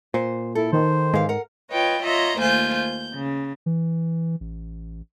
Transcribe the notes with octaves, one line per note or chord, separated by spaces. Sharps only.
A#2 C5
E4 A4
D#3 C5
G#2 E3 G#3 F5
A#4 F#5
F4 B4 C#5 D#5 G5
F4 C#5 D#5 E5 A#5 C6
D#2 A3 F4 C5 G#5 G6
G6
C#3
E3
A1